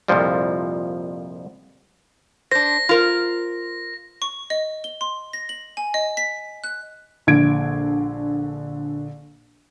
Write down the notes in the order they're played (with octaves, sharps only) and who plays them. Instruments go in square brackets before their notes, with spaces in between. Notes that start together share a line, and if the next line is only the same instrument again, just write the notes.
[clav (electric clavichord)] C2 F2 A#2 F3 G3
[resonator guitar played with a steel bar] D4 C5 [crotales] A#6
[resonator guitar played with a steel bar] F4 A#4 C5
[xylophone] C#6
D#5
G7
C6
A#6
F#7
G#5
D#5
B6
F#6
[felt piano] A#1 D3 G#6 D7